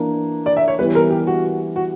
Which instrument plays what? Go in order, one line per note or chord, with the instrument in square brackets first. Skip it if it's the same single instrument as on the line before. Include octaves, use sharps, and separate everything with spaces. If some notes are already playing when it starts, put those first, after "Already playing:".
Already playing: [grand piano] E3 A#3 D4
[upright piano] D5
E5
C#5
[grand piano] E3 G3 B3 [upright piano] B4
[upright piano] A#4
G4
F#4
F#4